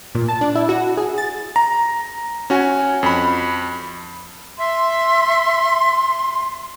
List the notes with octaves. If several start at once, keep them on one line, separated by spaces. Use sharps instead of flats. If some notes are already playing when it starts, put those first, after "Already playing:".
A#2
A5
D4
E4
F#4
G#4
A6
A#5
C#4 F#4 G#5
F2 B5
E5 C6